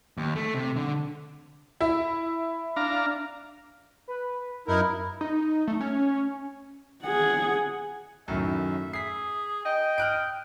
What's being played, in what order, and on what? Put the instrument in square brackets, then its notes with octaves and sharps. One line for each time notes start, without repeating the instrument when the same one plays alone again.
[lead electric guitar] D#2
A3
C3
D3
[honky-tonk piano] E4
[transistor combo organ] D4 F5 A#5
[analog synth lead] B4
[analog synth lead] F#2 [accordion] D#4 E4 A#4
[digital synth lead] D#4
A3
C#4
[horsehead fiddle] G#4 F#5
[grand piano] F#2 A2 D#3 [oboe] E5
[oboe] G#4 [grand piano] B6 C7
[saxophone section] D#5 [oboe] G5
[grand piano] F6 F#6 D7